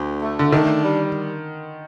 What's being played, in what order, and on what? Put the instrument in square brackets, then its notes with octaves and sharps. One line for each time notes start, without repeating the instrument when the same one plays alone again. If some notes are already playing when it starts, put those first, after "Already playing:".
Already playing: [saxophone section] D2
A3
[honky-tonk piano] D3
[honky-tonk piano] D#3 [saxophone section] D4
[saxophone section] G3